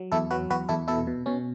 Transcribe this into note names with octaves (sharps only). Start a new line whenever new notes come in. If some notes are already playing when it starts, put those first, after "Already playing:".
Already playing: F#3
E2 E4 A4
F#3 F#4 B4
E2 F#4 B4
E2 E4 A4
B2 E4 A4
B2
B2 C#4